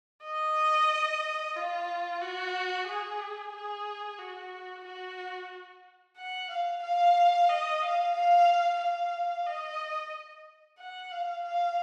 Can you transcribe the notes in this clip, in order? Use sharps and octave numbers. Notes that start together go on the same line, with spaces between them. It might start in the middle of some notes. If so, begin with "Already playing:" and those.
D#5
F4
F#4
G#4
G#4
F#4
F#4
F#5
F5
F5
D#5
F5
F5
F5
D#5
F#5
F5
F5